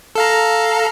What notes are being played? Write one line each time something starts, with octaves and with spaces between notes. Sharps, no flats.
A4 F5 A#5